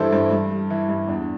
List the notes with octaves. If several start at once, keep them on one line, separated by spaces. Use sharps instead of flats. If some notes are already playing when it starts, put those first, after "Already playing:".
Already playing: G2 E3 G3 D4 E4 A4 C5
G2 C5
G2
G3
E3 E4
G2
E2 D4